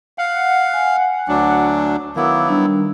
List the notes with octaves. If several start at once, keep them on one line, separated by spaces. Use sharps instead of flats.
F5 F#5
G#5
D2 F#3 D4
D#3 F#3 B3 E4 F5 D6 E6
G3 D4